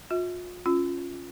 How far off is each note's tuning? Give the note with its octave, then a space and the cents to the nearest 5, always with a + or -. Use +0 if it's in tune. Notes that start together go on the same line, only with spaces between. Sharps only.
F4 +40 E5 -30
C#4 +0 F4 +0